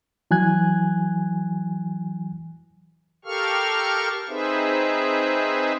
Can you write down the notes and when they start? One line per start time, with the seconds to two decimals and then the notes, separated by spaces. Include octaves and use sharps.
0.31 E3 F#3 G#5 F#6 G#6
3.25 G4 A4 A#4 F5 C#6 F6
4.29 C4 D#4 G#4 B4 C5 E5